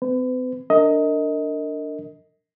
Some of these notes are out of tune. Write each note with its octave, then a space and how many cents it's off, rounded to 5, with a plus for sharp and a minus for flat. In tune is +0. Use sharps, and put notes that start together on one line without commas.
C4 -45 B4 +40
D4 +0 A#4 -30 D#5 +20